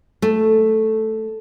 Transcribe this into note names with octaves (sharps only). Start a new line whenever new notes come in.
A3